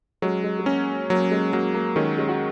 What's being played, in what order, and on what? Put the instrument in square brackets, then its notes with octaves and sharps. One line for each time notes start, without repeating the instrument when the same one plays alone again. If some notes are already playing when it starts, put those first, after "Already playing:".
[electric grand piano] F#3 [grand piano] G#3 C#4
[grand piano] G#3
G#3
[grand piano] A#3 [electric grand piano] C#4
[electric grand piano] F#3 [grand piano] A#3
[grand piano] G#3
[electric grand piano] F#3 [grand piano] A#3
[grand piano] A#3
[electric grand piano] D#3 [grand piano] G#3 C#4
[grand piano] G#3 C#4
F#4